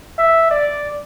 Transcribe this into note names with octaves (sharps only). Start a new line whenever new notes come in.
E5
D5